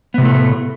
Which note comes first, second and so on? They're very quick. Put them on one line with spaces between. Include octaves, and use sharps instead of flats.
B3 C3 A2 A3